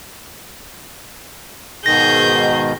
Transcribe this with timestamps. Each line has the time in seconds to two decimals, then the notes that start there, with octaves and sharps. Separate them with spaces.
1.86 G#2 B2 D#3 G#4 G6 A#6